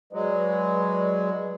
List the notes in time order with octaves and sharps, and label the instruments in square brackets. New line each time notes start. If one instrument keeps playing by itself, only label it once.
[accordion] F#3 G#3 [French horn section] B4 D5